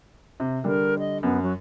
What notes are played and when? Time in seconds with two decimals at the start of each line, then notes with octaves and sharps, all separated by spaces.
0.40 C3
0.64 D3 G3 A#4
0.99 D#5
1.23 F#2 B3
1.43 F#3